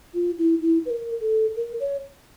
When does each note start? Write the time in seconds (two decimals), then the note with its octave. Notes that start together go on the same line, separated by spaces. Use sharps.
0.14 F4
0.38 E4
0.61 E4
0.85 B4
0.90 A#4
1.21 A4
1.56 A#4
1.80 C#5